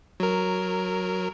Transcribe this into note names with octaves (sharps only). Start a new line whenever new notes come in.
F#3 A#4